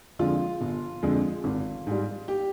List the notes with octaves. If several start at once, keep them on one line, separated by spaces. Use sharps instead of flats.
F2 D3 F3 G#3 F4
G1
F2 D3 F3 G#3
G#1
G#2 G3
G4